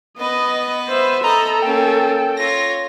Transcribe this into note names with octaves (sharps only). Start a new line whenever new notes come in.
B3 B4 D#5
C5 E5
A4 D#5 A#5 B5
A#3 C#4 G5
F4 C#5 A#6